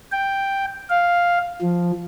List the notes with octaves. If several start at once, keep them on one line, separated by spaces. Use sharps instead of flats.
G5
F5
F3